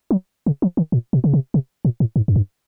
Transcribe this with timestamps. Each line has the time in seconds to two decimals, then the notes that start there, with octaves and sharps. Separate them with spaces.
0.11 F#3
0.46 C#3
0.62 F3
0.77 D#3
0.92 A#2
1.13 B2
1.24 C#3
1.34 C3
1.54 C3
1.85 A#2
2.00 A2
2.16 G#2
2.28 F#2
2.36 G2